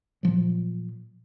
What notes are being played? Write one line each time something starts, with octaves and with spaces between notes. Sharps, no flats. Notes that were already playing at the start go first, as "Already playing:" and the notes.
A#2 F3 F#3